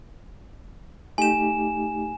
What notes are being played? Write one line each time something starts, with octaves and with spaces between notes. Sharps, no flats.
A3 D#4 G4 G#5 E7